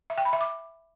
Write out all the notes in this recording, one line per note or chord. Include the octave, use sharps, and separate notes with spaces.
E5
G5
B5
E5
D6